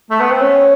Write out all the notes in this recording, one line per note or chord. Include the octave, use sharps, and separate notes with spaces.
A3
B3
C4
C#4